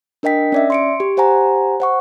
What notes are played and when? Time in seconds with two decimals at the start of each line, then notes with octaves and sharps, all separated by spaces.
0.23 D4 A#4 D#5 G5 B6
0.52 C#4 D5 E5
0.70 C6 C#7 D7
1.00 G4
1.17 G4 C5 F#5 G#5 A#5
1.80 C5 F#5 C#6